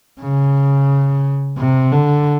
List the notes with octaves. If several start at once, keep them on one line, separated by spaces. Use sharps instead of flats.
C#3
C3
D3